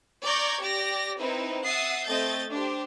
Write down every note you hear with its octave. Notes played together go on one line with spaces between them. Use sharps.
D5 A#5 C#6 G6 G#6 A#6
G4 D5 A#6
C4 D#4 E4 B4
E5 F#5 D#6 A6 C7
A3 C4 D#5 G6 A6
D4 G4 C5